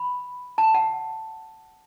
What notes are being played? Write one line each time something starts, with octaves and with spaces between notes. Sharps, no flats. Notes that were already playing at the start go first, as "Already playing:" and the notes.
Already playing: B5
A5
F#5